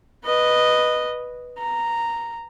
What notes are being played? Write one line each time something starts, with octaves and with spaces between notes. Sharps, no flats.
B4 D#5
A#5